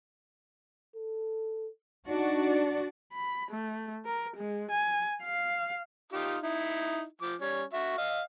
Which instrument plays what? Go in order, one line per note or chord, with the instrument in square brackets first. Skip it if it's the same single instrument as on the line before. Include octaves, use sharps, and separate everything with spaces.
[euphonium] A4
[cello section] D4 F#4 D5 [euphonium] D#4
[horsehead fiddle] B5
A3
A#4
G#3
G#5
F5
[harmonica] D#4 F4 G4
D#4 E4
F3 D6
G3 C#4
F#4 E5
D#5 F5